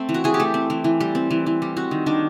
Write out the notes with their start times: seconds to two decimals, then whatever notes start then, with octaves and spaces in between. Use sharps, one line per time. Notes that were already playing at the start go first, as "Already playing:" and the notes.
Already playing: A3 C4
0.09 E3
0.14 F#4
0.24 E3 G#4
0.34 G4
0.40 A3
0.54 C4
0.70 E3
0.84 E3
1.00 G3
1.15 C4
1.31 E3
1.46 E3
1.62 G3
1.76 C4 F#4
1.91 D#3
2.06 D#3 D4